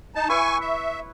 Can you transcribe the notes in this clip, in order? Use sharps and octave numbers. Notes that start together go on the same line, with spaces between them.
D#4 A5
E4 B4 C#5 G#5 C#6
E5